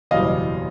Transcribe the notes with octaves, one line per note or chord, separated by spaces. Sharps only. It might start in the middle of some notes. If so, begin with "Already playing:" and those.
F#1 E2 B2 G3 D#5 F5